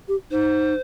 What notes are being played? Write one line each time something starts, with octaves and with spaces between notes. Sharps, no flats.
G4
D#4 C5